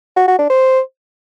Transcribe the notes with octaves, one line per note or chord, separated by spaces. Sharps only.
F#4
F#4
D4
C5